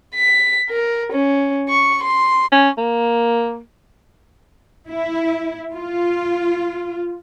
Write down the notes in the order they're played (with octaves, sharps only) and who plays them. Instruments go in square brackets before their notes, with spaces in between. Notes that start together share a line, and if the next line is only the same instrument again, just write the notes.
[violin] B6
A#4
C#4
C#6
C6
[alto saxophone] C#4
A#3
[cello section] E4
F4